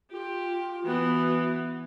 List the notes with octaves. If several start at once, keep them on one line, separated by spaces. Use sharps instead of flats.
F4 G4
E3 B3 F#4